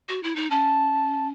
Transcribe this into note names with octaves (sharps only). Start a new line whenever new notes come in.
F#4
E4
D#4
C#4 A5